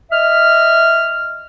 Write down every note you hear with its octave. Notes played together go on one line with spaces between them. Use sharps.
D#5 E5 F6